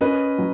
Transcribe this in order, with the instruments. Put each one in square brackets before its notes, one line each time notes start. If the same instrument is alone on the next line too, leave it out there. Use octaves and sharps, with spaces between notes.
[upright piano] C#4 [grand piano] B4 D#5
[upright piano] F#3